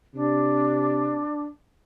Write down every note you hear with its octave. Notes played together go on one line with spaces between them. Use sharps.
C3 D4